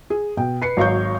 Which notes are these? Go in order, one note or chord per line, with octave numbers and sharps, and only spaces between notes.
G#4
B2 G5
B4 C7 C#7
G#1 F#3 C#5 F5 C#6 G6